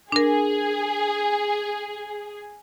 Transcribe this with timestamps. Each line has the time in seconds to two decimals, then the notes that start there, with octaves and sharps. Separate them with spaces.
0.12 D4 G#4 A#4